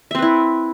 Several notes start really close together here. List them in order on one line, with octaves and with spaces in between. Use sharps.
E5 C4 B4 E4